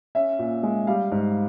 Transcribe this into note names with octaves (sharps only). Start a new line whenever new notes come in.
C#4 E5
A#2
G#3
G3 F5
G#2